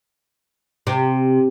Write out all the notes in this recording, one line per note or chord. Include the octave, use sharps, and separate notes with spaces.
C3